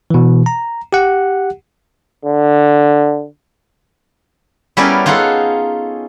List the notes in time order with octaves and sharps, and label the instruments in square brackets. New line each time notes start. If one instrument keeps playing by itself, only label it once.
[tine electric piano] B2 E3
A#5
G4 F#5
[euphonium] D3
[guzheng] G3 B3 C#4 E4 A#4 D5
D#4 F4 G#4 A4 F#5